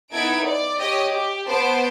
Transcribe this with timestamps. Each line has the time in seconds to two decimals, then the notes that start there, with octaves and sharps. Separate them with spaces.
0.12 B3 D#4 E4 A4 G#6 D7
0.46 D5
0.80 G4 C#5 D#5
1.11 G4
1.47 B3 C5 A5 C6 D7